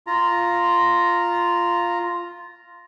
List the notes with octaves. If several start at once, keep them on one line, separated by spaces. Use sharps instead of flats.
F4 A#5